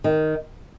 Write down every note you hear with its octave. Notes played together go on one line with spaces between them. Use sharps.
D#3